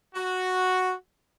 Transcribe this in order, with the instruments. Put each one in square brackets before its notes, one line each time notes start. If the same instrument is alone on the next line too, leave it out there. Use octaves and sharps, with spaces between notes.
[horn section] F#4